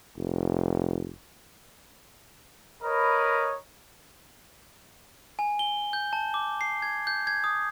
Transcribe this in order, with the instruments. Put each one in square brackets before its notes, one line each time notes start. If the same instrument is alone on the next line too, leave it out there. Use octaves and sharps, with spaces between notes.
[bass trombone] F1
[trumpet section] A#4 B4 C#5 D#5 A#5 B5
[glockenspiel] G#5
G7
G6
A5
D6
C7
G#6
G6
G#6
D#6